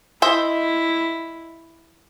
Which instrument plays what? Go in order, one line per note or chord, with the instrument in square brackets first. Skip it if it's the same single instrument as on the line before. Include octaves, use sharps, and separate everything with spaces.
[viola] E4 [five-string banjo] C5 D#5 E5